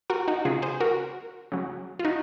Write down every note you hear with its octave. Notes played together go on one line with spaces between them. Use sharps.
F#4 A#4
D#4 F#4
C#3 F#3 F4 G#4
G#4 C5
F#4 A#4
C#3 F#3
F4
D#4 F#4